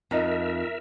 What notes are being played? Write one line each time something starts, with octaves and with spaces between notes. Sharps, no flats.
F2 D#4 A#4 E5